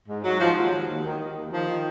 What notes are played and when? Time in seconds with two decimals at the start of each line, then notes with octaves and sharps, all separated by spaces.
0.08 G#2
0.23 G#2 F#3
0.40 G#2 F3
0.56 D#2 F#3
0.72 D#2
0.87 D#2
1.04 D#3
1.20 D#3
1.35 D#2
1.51 D#3 F3
1.68 D#3